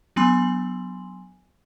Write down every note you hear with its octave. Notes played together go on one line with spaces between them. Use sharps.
F#3 B3 D4 G#5 C6 F#7